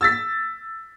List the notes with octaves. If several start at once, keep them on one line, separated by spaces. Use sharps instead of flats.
E6 A6 B6